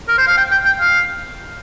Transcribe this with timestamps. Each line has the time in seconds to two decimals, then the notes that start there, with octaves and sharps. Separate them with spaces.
0.08 A#4
0.18 C5
0.27 F5
0.37 G5
0.51 G5
0.65 G5
0.80 F5